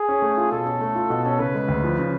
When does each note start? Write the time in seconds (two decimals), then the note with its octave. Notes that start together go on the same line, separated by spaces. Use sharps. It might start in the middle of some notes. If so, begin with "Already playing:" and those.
Already playing: G#4
0.09 C#4
0.22 A3
0.37 F4
0.52 B2 A4
0.66 C#4
0.81 A3
0.95 F4
1.10 B2
1.26 C#4
1.40 C#3 B4
1.55 G#3
1.68 D2
1.84 F3
1.99 C#3